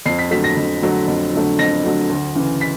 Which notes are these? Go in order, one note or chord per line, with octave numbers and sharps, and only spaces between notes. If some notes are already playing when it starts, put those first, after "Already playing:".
F2 C7
B6
D3 F#3 A3 B6
A#6
F2
D3 F#3 A3
F2
D3 F#3 A3
F2 A#6
D3 F#3 A3
D2
C#3 E3
B6